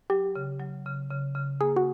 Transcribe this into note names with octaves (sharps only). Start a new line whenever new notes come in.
F#3 G4
C#3
F#3
C#3
C#3
C#3
A#3 G#4
F#4